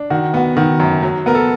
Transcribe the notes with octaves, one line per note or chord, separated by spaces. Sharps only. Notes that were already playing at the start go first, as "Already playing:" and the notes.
Already playing: D4
D#3 F#4
B3 F#4
D#3 F#4
F#2
F#3
B3 A#4
A4